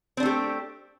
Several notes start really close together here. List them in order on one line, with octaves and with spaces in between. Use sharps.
C4 D4 A3 G4